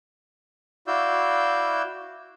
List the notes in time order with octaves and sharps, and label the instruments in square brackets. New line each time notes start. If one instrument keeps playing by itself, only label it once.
[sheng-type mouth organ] E4 F#4 D5 F5 E6 G6